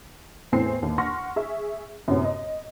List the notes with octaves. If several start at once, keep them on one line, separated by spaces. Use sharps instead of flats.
E2 A2 A3 C4 G#5 C7
D#2
F#5 C6 C#6 F6 A#6
G#4 E5 C#6
F#2 A2 C3 B3 C#4
D#5